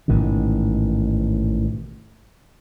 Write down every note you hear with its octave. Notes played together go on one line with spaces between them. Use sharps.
A1 G#2 B2 D#3